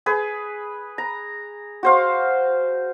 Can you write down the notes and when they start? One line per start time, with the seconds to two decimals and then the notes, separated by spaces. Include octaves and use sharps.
0.06 G#4 B4
0.98 A#5
1.83 F#4 C5 F5